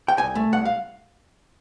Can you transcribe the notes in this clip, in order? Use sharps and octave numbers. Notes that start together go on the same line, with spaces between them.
G5
C2 G#5
A3
C2 F#5
F5